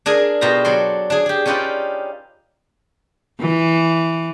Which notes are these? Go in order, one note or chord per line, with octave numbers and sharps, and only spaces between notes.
D4 G#4 A#4 G#5
B2 F4 G4 A#5
F#3 A4 D5 C6
D4 G#4
G4 G#4
C#4 D#4 F4 G4 B4 D5
E3